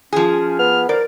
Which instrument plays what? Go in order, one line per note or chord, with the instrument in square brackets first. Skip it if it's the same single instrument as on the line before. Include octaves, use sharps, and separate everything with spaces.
[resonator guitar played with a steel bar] F3 G#4 [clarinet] C#4
[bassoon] B3 [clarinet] F6
[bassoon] A#4 [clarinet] C5 [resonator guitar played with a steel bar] D5